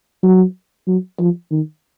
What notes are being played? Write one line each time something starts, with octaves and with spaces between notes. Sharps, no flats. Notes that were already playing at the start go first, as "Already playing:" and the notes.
F#3
F#3
F3
D#3